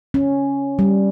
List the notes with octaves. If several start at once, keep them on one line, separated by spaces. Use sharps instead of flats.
C#4
G3